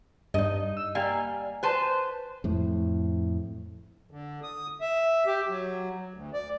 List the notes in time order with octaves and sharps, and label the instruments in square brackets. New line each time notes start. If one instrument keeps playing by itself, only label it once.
[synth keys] G2 [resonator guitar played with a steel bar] D#4 D#5
[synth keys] E6
[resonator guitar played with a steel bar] G3 A#3 F5 [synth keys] G#5
[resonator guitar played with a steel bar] B4 C5 A5
[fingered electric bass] F2 A2
[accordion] D3
D#6
E5
G4
F#3
D2
D5